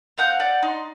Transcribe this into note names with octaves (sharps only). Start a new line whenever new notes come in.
C4 F5 F#5 G6
D5 F#5
D#4 C6